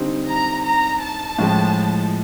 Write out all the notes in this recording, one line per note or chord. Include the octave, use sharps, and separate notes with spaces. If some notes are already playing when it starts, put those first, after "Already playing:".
Already playing: D3 G3 C4 D#4
A#5
A#5
A5
A2 F3 G#3